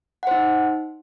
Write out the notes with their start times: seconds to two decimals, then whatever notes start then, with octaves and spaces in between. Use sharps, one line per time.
0.23 F#5
0.27 C5
0.31 D#4